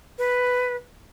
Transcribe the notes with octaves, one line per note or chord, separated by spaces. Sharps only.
B4